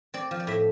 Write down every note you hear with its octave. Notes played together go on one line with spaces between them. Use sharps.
C4 D5
F3
D5
A2 E5